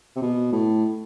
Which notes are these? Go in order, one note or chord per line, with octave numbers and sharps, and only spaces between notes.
C3
B2
A2